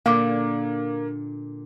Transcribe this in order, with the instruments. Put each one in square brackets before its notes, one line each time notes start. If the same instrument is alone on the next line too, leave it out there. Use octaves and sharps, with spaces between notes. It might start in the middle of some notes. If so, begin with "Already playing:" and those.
[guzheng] A#2 D3 [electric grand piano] A#3 [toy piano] F5 D6